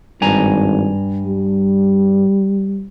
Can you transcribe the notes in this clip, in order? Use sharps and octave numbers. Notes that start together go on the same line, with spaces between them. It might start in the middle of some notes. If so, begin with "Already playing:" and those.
G#1 G2 G#5 A#5
G3